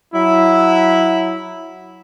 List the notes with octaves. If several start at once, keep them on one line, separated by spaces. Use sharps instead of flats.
F#3 E4